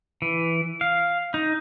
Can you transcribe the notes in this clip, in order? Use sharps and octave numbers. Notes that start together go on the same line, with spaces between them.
E3
F5
D#4